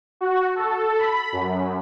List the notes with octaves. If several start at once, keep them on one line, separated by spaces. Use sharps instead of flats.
F#4
A4
B5
F#2